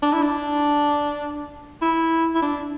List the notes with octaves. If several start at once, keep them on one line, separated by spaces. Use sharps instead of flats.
D4
E4
D4
E4
E4
D4